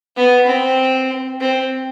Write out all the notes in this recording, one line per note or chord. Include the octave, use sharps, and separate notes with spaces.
B3
C4
C4